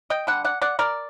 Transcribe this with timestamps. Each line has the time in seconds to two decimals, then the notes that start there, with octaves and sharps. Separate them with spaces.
0.10 D#5 G5
0.27 D3 G3 F#5
0.44 D5 F#5
0.62 D5 F#5
0.79 A#4 D5